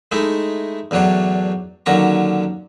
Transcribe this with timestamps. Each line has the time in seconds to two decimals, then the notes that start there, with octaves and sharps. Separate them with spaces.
0.12 G#3 A3 D#4 E4
0.91 E2 A2 F#3 D4 C#5
1.86 D#2 D3 F#3 C#4 A#5 C#6